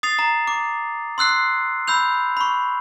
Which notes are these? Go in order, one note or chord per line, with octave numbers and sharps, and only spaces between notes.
D#6 A6 C7 F7
A#5
D6
C6 E6 F#6 C7
B5 E6 G6 F7
B5 C#6